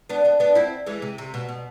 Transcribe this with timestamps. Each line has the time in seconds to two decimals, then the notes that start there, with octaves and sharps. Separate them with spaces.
0.09 B3 D4
0.25 B3 D4
0.40 B3 D4
0.55 C4 E4
0.86 E3 G#3
1.02 C3
1.18 C3
1.34 B2
1.49 B2